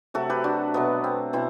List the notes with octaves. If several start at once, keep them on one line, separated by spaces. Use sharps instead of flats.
C3 F#3 A3 F#4 A4
G4 B4
D4 F#4
B2 F#3 A3 B3
C4
B2 C4 E4